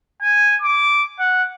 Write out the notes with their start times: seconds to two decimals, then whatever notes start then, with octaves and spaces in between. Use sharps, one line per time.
0.22 G#5
0.62 D6
1.19 F#5